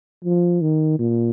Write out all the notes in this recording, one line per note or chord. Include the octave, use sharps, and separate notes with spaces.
F3
D#3
A#2